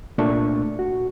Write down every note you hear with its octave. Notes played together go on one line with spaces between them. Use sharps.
C2 A#2 A3 D4 C#6
F#4